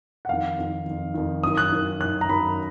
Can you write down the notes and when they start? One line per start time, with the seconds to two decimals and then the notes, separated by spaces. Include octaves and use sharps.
0.25 F#5
0.29 F2 D#3 F5
0.58 F2 D#3
0.86 F2 D#3
1.14 F2 D#3
1.43 F#2 D#3 D#6
1.57 F#6
1.72 F#2 D#3
2.00 F#2 D#3 F#6
2.21 A#5
2.29 F#2 D#3 B5